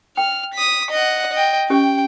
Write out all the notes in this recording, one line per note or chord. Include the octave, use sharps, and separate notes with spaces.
G5 F6
D#6 B6
D#5 F#5
D#5 G5
C#4 G4 D#5 G5